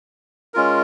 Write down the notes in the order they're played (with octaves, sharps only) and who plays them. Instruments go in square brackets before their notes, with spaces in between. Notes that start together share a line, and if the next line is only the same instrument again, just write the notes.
[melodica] G#3 C#4 F4 A#4